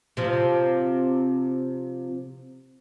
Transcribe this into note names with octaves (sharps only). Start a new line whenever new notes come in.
C3 F3